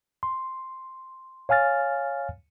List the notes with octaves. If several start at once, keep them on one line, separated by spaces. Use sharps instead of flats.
C6
C#5 F5 G#5 F6 A6